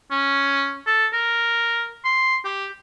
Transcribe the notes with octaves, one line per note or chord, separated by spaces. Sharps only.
C#4
A4
A#4
C6
G4